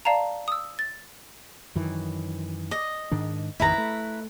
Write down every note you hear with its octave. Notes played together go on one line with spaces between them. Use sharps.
D5 F5 A5 A#5
D#6 E6
A6
F#2 D#3 E3
D#5
G#2 D#3 D4
A1 F2 D#3 E4 B4 A#5
A3